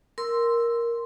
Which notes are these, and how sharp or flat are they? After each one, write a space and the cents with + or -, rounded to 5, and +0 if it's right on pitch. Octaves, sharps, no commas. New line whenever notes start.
A#4 +5 C6 +0 E6 +0